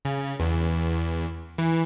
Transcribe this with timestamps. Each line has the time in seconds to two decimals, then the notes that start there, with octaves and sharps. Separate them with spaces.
0.05 C#3
0.40 E2
1.58 E3